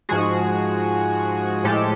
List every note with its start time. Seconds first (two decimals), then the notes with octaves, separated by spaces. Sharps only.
0.09 G#2 F3 G#3 F#4 G#4
1.64 A2 F3 G#3 G4 A4